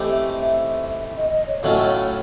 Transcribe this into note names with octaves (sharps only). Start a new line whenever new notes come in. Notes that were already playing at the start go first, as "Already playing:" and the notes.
Already playing: E3 A3 C4 D#4 G4
E5
D#5
D#5
C#5
A2 F#3 A3 C#4 F4 D#5
C#5